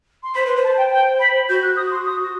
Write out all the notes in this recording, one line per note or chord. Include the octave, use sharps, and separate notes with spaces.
C6
C5 B5
B4 C6
C5
A5
G5
G5
B5
F#4 G6
F#6
D#6
C6
D#6